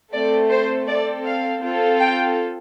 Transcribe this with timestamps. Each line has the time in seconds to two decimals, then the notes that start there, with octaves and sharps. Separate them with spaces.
0.13 A3 C4 A4 D5
0.50 C5
0.88 C4 A4 D5
1.25 F5
1.62 C4 F4 A4
2.00 G5